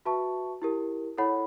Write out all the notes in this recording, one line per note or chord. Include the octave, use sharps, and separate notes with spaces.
F#4 B4 E5 A5 C#6
E4 G4 A#4
E4 A4 C#5 F#5 B5